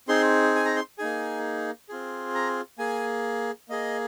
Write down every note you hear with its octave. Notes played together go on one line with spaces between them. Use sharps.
C4 D#4 G#4 C6
G#5
A#5
C6
A#3 D#4 G#4 G#5
C4 F4 G#4
A#5
A#3 G#4 G#5
A#3 G#4 D#5